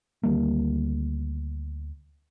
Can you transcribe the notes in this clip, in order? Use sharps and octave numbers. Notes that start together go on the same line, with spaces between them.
D2 D#3 G3 A#3